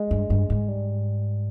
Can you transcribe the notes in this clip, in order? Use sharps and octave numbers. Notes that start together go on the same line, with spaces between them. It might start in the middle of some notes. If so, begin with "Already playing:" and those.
Already playing: G#3
G2
G2
G#2
G3